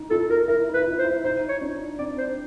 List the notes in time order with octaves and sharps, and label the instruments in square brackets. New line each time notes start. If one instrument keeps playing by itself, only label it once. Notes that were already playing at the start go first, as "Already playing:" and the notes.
Already playing: [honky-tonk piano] D#4
[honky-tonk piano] F4 [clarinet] A4
[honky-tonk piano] F4 [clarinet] A#4
[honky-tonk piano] E4 [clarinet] A#4
[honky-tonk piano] D#4
[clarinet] B4
[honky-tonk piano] E4
D#4
[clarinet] C5
[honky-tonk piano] E4
[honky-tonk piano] D#4 [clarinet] C5
[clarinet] C#5
[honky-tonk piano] D4
[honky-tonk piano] C4 [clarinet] D5
[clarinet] C5